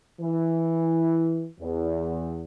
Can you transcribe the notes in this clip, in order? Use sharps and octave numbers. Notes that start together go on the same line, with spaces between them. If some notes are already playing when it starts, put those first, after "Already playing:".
E3
E2